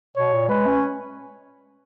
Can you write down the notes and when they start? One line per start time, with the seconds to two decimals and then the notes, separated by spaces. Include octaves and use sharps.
0.16 B2 C#5
0.33 A#2
0.49 G#3 B4
0.67 C#4